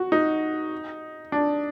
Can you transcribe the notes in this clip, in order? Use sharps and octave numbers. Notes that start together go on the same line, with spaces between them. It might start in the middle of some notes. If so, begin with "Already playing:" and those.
Already playing: F#4
D#4
D4